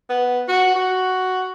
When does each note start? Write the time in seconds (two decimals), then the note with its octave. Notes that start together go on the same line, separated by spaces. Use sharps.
0.09 B3
0.48 F#4
0.75 F#4